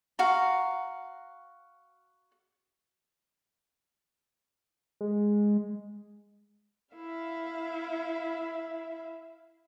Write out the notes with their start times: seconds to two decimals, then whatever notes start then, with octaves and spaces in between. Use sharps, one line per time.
0.19 F#4 F5 A#5
5.01 G#3
6.95 E4 E5 F5